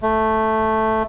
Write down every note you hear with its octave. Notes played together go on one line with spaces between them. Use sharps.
A3